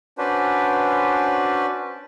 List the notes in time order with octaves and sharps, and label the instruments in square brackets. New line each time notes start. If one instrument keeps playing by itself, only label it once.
[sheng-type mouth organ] C#4 D4 F#4 B4 C5